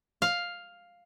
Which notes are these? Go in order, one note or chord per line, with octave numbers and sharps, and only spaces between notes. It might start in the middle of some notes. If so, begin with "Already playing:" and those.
F5